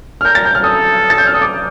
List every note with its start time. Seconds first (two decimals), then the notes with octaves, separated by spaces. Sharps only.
0.21 F6
0.25 A#4 G6
0.35 A6
0.45 G6
0.55 F6
0.64 A4 D#6
1.10 A6
1.18 G6
1.27 F6
1.34 D#6
1.42 D6